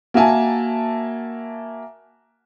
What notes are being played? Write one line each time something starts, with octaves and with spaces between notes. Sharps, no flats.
A#3 F#4 E5 G#5 A5